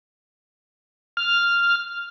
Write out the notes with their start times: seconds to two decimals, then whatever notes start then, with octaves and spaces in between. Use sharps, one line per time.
1.17 F6